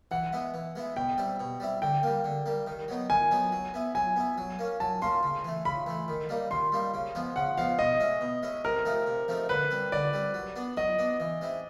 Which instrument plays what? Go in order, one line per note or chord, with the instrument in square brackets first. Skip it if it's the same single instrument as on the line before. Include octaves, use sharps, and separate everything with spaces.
[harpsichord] E3 [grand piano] F#5
[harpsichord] G#3 B3 E4
E3
G#3 B3 E4
[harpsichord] B2 [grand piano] G5
[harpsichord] G3 C4 E4
B2
G3 C4 E4
[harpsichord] D3 [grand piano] G5
[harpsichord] G3 A#3
D3
G3 A#3
D#3
F#3 B3 D#4
[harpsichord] D#3 [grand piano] G#5
[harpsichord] F#3 B3 D#4
F#3
B3 E4
[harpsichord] F#3 [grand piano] G#5
[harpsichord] B3 E4
F#3
A#3 C#4
[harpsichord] F#3 [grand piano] A5
[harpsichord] A#3 C#4 [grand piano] C6
[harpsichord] C#3
E3 A3
[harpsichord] C#3 [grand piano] B5
[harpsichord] E3 A3
D#3
G3 A#3 D#4
[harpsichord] D#3 [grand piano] C6
[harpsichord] G3 A#3 D#4
C#3
F3 G#3 B3
[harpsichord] C#3 [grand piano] F#5
[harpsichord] F3 G#3 B3 [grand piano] F5
[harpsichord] B2 [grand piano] D#5
[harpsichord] G#3 C#4 E4
B2
G#3 C#4 E4
[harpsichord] C3 [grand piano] A#4
[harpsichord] F3 A3 C4 D#4
C3
F3 A3 C4 D#4
[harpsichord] D3 [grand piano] B4
[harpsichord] G3 C4
[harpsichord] D3 [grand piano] D5
[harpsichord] G3 C4
F#3
B3 D4
[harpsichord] F#3 [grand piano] D#5
[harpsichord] B3 D4
E3
G#3 C4 E4